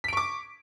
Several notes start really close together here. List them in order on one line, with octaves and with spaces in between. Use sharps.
B6 D7 C#6 D6